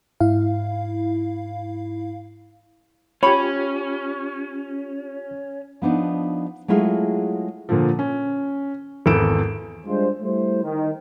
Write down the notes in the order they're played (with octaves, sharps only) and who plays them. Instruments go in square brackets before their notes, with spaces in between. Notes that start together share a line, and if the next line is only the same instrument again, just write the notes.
[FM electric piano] G#2 E4 F5
[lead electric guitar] C#4 [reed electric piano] F4 G4 [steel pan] C#5 [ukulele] B5
[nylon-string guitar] F3 B3 D4 D#4
F#3 G#3 A3 E4 F4 G#4
[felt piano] A#2 D3 F3
C#4
G#1 E2 A4 D7 E7
[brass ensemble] G3 G#3 D4 F4 C5
G3 A3 E4 C5
D#3